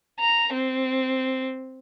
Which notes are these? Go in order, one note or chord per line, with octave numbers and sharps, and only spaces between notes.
A#5
C4